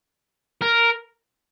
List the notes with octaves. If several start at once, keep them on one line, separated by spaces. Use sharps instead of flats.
A#4